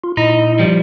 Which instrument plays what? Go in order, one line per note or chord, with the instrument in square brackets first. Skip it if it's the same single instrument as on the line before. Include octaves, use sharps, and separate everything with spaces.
[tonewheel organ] F4
[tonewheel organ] A#2 E4 D#5 [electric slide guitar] D#4
[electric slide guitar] F3 G3